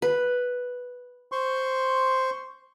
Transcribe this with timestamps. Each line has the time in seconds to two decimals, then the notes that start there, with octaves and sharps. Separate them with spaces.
0.02 B4
1.32 C5 C6 C#6